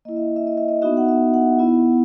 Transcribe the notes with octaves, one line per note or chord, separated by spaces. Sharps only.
A#3 E4 D#5
E5
D#5
E5
D#5
E5
D#5
B3 D#4 F#4 E5
F#5
E5
F#5
B3 E4